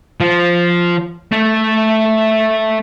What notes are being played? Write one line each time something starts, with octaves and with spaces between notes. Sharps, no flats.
F3
A3